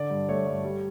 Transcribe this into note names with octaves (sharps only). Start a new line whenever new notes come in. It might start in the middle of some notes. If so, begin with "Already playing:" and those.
Already playing: D3 D5
G2
A3 C#5
G2
G3